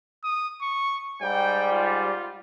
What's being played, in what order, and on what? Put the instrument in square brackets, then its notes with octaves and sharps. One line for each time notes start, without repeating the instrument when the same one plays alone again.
[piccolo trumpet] D#6
C#6
[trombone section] G#2 G3 [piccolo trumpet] G5
[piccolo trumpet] F4